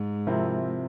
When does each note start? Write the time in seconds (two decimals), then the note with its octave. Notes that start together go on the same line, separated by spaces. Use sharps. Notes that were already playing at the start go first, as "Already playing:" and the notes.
Already playing: G#2
0.27 C3 F3 C4 E4 A#4